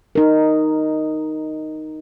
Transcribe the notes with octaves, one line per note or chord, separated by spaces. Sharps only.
D#4 A#4